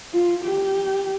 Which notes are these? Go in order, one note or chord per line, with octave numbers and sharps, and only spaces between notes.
F4
G4